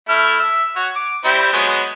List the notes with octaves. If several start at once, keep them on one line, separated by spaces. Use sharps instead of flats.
A3 E4 F6
E5
F#4 C#5
D6
G3 C4 E4
F#3 G#3 B3